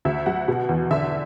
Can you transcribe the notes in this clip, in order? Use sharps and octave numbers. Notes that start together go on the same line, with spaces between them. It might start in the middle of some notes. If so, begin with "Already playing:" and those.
D2 E5
F#3 F#5
B2
E2
D3 E5